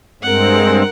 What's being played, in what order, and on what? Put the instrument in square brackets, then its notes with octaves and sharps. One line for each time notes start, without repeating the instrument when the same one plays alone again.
[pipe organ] G2 G#3 C4 [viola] A#4 F#5